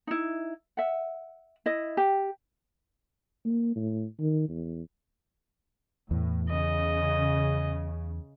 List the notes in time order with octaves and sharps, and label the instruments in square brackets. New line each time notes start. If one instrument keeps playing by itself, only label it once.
[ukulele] D#4 E4
E5 F#5
E4 D#5
G4
[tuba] A#3
A2
D#3
E2
[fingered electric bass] E2 [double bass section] A2
[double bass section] C#3 [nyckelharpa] D#5